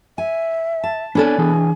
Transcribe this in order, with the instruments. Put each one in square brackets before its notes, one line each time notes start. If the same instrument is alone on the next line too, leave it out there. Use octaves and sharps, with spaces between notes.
[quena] E5 [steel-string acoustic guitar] G#5
[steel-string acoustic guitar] A5
[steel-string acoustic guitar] B3 A4 B4 [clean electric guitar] D4 C#5 D5 [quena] G#5
[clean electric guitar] E3 D4 G#4